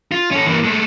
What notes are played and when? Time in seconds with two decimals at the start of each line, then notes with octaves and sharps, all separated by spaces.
0.12 F4
0.31 C#4 A4
0.46 E3 A#3
0.64 G#3 A3